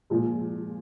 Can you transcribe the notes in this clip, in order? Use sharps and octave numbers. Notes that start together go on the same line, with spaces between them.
A#2 F3 G#3